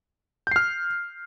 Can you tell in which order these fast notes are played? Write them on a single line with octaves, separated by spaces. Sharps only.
G6 C7 F6